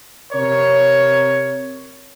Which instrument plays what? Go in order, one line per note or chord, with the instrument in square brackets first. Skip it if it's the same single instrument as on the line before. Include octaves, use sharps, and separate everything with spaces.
[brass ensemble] C3 A#4 C#5